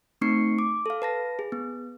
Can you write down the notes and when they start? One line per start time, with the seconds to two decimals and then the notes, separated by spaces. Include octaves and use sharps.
0.21 A3 C4 D#4 C#6 C7 C#7
0.58 D6
0.86 A4 F5
1.02 B4 A5 A#6
1.39 G#4
1.52 B3